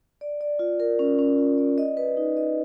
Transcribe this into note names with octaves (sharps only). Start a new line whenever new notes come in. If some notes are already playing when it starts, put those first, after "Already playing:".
D5
D5
F4
A#4
C#4
C#4
F4
D5
D#5
B4
D#4
D#5